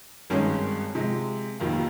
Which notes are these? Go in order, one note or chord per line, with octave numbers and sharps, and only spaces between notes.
G#1 G2 D#3 G#3 C#4
C3 F3 G#3
F1 F2 D#3 A#3